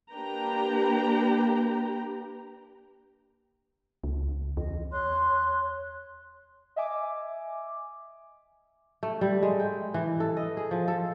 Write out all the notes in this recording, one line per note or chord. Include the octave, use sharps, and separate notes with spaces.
A#3 D4 G4 B4 G5 A#5
C#2
E2 D#5
C#5 C6 F#6
D#5 E5 G#5 D6
A3
G3
G#3
G5
E3
A4
D#5
G#4
F3
A4